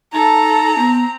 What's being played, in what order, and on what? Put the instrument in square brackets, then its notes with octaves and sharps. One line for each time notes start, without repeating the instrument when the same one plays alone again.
[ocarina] D#4 [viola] A4 A5 [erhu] A#5
[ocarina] B3 [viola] C4